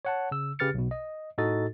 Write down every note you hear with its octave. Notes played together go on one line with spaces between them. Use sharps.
C#5 F#5 A5
C#3 E6
C#3 G4 B4 F6 A6 C#7
B1 B2
D#5
A2 D#4 F#4 A4 D#5 A6